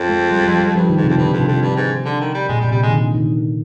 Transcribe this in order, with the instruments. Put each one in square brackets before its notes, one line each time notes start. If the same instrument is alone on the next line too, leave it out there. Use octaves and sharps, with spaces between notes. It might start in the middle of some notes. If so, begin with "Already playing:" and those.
Already playing: [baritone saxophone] F2
[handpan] G#3
G3
F3
G3
[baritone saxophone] G2 [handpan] F3
[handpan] D#3
[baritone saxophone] G#2
[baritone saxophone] F2 [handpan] C3
[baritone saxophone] G2 [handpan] D3
[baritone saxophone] F2
[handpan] C3
[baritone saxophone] F2
G2
G#2
D3
D#3
G3
[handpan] A#2 [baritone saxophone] G#3
[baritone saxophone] G3
[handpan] A#2
[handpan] C3 [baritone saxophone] G3
[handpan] D#3 [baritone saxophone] G#3
[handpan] D3
D#3